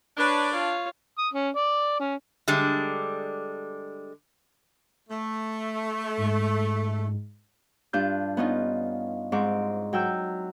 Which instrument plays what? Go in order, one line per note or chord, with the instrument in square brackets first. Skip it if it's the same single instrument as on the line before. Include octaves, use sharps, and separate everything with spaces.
[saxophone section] D4 [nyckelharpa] B4 C#5
[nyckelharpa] F4 C#5
[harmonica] D#6
C#4
D5
C#4
[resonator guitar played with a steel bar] D3 G3 G#3 D4
[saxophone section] A3
[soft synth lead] G#2
[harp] G2 D4 F4 G6
B3 C#4 D#4 F4
G#2 C4 C#6 D6
F#3 G5 E6 G6